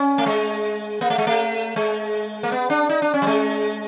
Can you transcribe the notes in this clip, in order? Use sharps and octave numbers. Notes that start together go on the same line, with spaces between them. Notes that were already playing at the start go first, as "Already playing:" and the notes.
Already playing: C#4
A3
G#3
A#3
A3
G#3
A3
G#3
A#3
B3
D4
D#4
D4
C#4
G3
G#3